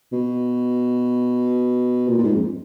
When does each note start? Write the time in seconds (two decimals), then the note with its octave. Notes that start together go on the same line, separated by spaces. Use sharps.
0.13 B2
2.08 A#2
2.18 A#2
2.24 G#2
2.35 F2